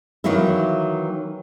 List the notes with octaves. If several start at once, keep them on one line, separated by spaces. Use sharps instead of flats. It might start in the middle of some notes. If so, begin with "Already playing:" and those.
D#3 E3 F#3 A#3 D#4 E4